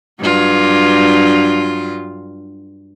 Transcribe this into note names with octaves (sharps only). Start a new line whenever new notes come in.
G2 F#3 F4